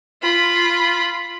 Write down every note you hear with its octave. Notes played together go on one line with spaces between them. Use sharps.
F4 B5